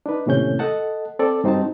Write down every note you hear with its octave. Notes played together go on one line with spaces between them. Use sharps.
D4 D#4 B4
D#2 A2 C3 C#4 G6
A4 D#5 F#5 A5
C4 A4 D5
G2 C4 D#4 F#4 A5